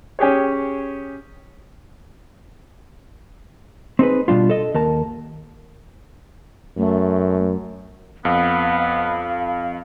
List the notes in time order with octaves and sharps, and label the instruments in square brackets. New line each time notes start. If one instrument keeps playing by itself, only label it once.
[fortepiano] C#4 G4 G#4 C#5
[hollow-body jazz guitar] C4 D#4 G#4 B4
B2 G3 D4 F4
A4 D#5
D#2 A#4 A5
[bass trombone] F#2 [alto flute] A3
[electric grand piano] F2 [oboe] B3 [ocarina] F5